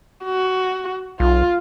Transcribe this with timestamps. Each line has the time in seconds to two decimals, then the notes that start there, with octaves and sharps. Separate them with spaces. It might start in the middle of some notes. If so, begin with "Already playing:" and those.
0.24 F#4
1.20 B1 F4